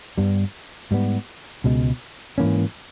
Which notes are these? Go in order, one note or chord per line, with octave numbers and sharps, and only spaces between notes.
G2 G3 B3
G#2 G3 B3
C#2 B2 G#3
G#2 E3 A#3 C#4